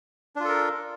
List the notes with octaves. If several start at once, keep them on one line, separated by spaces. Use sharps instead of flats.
D4 F4 A4 A#4